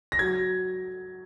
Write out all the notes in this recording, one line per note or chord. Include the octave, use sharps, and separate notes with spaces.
A#6
F#3 G#6